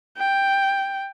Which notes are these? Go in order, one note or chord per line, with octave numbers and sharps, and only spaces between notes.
G5